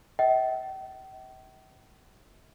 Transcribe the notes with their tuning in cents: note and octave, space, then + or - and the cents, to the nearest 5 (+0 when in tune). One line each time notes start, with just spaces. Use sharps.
E5 -45 G5 -45